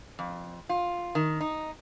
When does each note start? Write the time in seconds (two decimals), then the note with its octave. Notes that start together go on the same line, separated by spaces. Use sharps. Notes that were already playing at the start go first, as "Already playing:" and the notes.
0.19 F2
0.69 F4
1.15 D#3
1.41 D#4